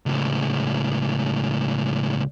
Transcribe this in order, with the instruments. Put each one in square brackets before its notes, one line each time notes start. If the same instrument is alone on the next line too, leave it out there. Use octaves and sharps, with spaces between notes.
[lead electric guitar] C#2 A2